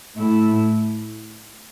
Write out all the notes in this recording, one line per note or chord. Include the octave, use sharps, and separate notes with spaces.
A2 A3 E4